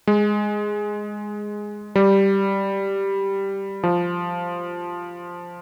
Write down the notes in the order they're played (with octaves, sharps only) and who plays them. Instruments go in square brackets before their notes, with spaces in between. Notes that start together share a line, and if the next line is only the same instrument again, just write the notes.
[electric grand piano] G#3
G3
F3